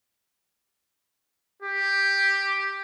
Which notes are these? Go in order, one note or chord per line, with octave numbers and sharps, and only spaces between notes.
G4